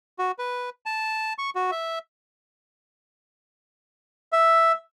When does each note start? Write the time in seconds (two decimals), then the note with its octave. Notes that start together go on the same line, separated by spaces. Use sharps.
0.19 F#4
0.39 B4
0.86 A5
1.38 C#6
1.55 F#4
1.71 E5
4.33 E5